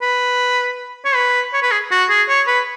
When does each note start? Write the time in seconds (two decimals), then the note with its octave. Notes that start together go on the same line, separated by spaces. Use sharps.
0.02 B4
1.05 C#5
1.15 B4
1.53 C#5
1.62 B4
1.71 G#4
1.91 F#4
2.10 G#4
2.29 C#5
2.47 B4